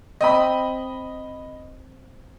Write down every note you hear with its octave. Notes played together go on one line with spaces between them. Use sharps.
C4 D#5 G5 B5